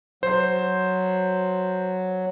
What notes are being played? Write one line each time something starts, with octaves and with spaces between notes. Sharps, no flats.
F#3 C5